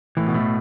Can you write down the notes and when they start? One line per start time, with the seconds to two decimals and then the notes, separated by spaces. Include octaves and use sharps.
0.17 A2 E3
0.26 B2
0.34 A2 A3